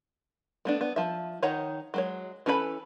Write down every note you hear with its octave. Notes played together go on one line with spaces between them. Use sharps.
A3 B3 D4
B3
F3 E5
D#3 D#4 C#5 F#5 A#5
F#3 G#3 C#5
E3 C#4 A4 B4 B5